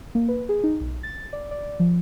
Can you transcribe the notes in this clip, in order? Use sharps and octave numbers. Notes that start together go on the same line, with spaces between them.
A#3
B4
G#4
D#4
B1
A6
D5
D5
F3